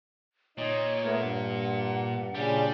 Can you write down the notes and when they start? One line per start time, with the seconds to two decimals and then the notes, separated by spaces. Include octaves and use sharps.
0.58 A#2 D#4 C#5
1.04 A3 B3 A#4
1.20 G2 F#5
2.35 A#2 C#3 G3 D4 G4